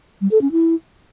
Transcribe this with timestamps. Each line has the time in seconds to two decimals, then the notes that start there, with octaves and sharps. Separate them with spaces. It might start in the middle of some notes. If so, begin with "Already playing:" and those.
0.21 G3
0.31 A4
0.42 C#4
0.52 E4